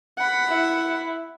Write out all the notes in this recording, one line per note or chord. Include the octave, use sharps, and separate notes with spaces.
F#5 B5
E4